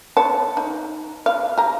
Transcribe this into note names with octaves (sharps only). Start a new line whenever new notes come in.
C#5 A5
D#4
F5
G4 A#5